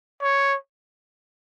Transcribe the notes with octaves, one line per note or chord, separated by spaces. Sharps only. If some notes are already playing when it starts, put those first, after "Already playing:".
C#5